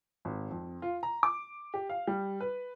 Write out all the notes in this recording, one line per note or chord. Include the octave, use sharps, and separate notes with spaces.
G#1
F2
F4
A#5
D6
G4
F5
G3
B4